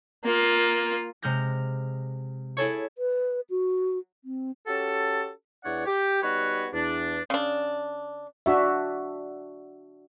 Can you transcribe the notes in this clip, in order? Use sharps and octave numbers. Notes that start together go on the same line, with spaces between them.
A#3 F4
C3 G#3 F6 G6 A#6
E4 G#4 A4 C#5
B4
F#4
C4
C#4 F#4 G4 A4
E2 E3 D4 C#5 D5 F#5
G4
G3 B3 D#4 F#4 B4 C#5
E2 D4
C#3 D4
D4 F#4 E5